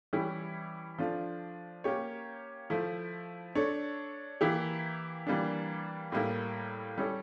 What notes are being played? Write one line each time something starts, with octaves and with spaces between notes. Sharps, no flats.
E3 G3 C#4 E4 G4
F3 A3 D4 F4
A#3 C#4 G4 C#5
F3 A3 E4
A3 D4 A4 C#5
E3 A#3 E4 G4
E3 G3 A#3 D4
A2 G3 A#3 E4
G3 C#4 E4 A4